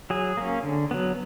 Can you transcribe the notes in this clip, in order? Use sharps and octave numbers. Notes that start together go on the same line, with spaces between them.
F#3 G#4
A#3 C#4
D3
F#3 B3